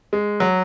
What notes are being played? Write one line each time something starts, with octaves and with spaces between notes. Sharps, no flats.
G#3
F#3